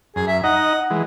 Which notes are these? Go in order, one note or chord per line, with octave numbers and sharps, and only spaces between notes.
F#2 G#4
E5
D#4 D#5 F#5
E3 G#3